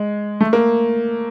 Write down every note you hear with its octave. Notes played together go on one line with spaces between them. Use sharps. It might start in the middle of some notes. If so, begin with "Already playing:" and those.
Already playing: G#3
A3
A#3